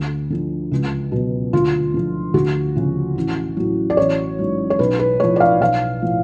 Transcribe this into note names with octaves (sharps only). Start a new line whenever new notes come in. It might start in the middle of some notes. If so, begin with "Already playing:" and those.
Already playing: D2
D3 F3
C#2
B2 F#3
D2 F4
D3 F3
D2 F#4
C#3 F3
A1
A2 F#3
D5
A1 C#5
G#2 F#3
C#5
B1 B4
B4
A2 F3 C#5
D5
F5
B1 F5
A2 F3